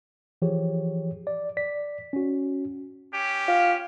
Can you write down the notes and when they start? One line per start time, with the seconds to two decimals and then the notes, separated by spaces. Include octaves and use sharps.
0.42 E3 F3 G4 G#4 C#5
1.27 D5
1.57 D5 B6
2.13 C#4 F#4
3.12 C#4 G4
3.48 F4